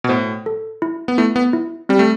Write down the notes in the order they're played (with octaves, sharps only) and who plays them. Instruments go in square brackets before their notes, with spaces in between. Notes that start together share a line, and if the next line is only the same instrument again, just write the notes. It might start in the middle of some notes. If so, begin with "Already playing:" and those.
[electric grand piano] B2
[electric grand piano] A2 [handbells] C5
[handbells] A4
E4
[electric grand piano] B3
[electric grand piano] A3 [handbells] E4
[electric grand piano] B3
[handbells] E4
[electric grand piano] G3 [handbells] C4
[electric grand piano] A3